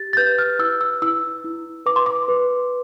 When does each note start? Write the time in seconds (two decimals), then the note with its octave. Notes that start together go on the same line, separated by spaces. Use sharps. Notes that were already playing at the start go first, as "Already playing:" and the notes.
Already playing: G4 A6
0.13 A6
0.17 B4 G6
0.38 F6
0.59 E4 E6
0.81 E6
1.02 E4 E6
1.44 E4
1.86 B4 D6
1.96 C6
2.06 D6
2.28 B4